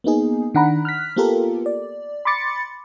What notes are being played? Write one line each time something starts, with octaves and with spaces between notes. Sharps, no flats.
A#3 B3 D#4 G#4
D#3 D4 F#5 A#5 B5
F6 F#6 B6
A#3 B3 F4 G4 A4 A#4
D5
B5 C6 D6 A6 C#7